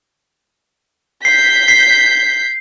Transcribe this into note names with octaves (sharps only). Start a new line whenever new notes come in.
G6 B6 C7
C7